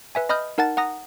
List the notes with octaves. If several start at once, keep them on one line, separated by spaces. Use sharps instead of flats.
B4 E5 G#5
D#5 B5 D#6 F6 G6
D#4 A#4 F#5 A5 A6
F#5 A#5 D#6 A#6